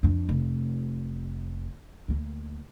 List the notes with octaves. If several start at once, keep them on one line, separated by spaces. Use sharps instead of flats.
F2 D4
F1
D2 A#3